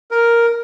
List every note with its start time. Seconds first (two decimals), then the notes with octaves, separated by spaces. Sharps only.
0.11 A#4